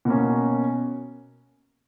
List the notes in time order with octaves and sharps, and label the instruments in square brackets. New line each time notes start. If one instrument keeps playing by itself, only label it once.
[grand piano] B2 A#3 C#4